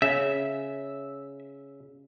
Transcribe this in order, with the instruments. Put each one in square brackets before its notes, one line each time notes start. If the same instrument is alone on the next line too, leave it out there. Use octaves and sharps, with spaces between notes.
[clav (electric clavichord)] C#3 [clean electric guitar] E5